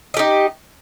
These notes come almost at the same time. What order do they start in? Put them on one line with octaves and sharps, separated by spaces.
D#5 G4 D#4